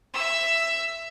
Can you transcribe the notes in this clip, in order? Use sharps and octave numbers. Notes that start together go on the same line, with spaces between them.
E5 E6